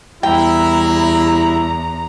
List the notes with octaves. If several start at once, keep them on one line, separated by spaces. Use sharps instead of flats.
E2 G3 E4 G5 A#5